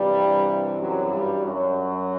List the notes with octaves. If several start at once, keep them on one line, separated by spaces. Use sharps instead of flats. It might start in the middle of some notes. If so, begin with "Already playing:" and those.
Already playing: G2 C3 E3 G3
F#2 F#3
G2 G3
F#2 F#3